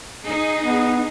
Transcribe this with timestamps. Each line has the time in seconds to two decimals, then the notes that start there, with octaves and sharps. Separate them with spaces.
0.24 D#4 G#4
0.63 B3